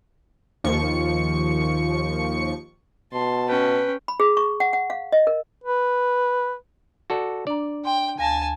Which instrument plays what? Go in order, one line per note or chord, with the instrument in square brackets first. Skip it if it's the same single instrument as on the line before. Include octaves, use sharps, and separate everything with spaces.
[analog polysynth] D#2 F3 C#6 C#7
[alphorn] B2 [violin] A5 [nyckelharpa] C6
[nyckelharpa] C#4 G5 [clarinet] B4
[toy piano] B5
G#4
C#6
F#5
F#5
F5
D#5
A#4
[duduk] B4
[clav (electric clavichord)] F#4 A4 D5
[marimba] D4 A#5 [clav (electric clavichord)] D5
[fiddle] G5 [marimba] C6
[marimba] D2 F5 A#6 [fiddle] G#5 A5